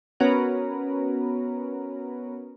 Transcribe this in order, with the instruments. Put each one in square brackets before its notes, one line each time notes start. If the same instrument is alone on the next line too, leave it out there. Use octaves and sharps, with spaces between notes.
[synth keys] B3 C#4 F#4 A#4 B4